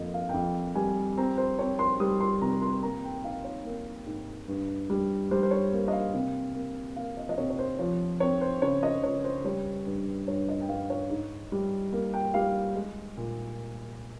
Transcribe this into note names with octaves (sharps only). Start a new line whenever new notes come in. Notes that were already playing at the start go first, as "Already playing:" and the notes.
Already playing: F2 A#3 D#5 F5
F5
G5
F2 F5
G3 G#5
C4 A#5
C5
C4 C#5
C6
G3 D#6
C6
C3 A#5
C6
A#3 A#5
G5
D#4 F5
C#5
A#3
G#2
G2
G3
G3 C5
C5
C#5
A#3
D#5
F5
C3
A#3
A#3 F5
D#5
D#5
C3 C#5
C#5
C5
F3 C#5
C4 C#5
C5
C#3 C#5
D#5
C#2 C#5
C5
G3 C#5
G2
G2 C#5
D#5
G5
G2 F5
C#5
G#2
G3
A#3
G5
G3 F5
G#3
A#2